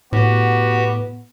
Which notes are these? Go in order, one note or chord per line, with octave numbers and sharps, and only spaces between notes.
A2 B3 F#4 G4 F#5